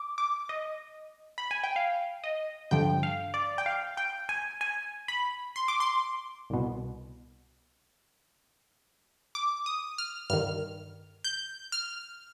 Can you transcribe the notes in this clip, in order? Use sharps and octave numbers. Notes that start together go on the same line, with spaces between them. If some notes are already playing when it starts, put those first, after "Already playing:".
Already playing: D6
D6
D#5
B5
G#5
G5
F5
D#5
G2 D3 F3 G5
F5
D5
G5
F5
G5
G#5
G#5
B5
C6
D6
C6
C2 B2
D6
D#6
F6
G2 D#3 F6
G6
F6